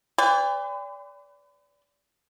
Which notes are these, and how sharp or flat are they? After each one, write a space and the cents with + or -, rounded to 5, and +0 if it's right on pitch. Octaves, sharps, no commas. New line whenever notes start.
B4 +40 D5 -30 G5 +40